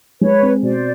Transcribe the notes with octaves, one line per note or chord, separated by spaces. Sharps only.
G#3 B4 C#5
C4
B2 C5 D5